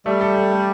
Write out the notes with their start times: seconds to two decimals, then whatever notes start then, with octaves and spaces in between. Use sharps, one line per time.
0.06 G3 A3
0.21 A4
0.36 A4
0.52 A3